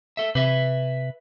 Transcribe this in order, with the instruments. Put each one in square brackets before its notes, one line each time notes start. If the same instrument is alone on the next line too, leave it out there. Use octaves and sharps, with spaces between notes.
[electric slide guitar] A4 E5
[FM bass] C3 [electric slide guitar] B4 E5